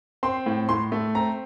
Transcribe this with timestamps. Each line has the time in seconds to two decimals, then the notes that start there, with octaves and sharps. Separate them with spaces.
0.23 C4 C6
0.46 A2
0.69 A2 C6
0.92 A3
1.15 C4 A#5